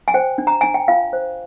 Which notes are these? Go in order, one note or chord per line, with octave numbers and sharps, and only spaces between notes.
G#5
C5 G5
D4
A#5
D4 G#5
G5
F4 F5
C5